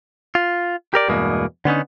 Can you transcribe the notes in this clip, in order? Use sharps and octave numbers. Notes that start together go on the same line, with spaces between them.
F4
G4 A#4 D5
E2 G2 B2 G#3 A#3 B3
D3 B3 C#4 D#4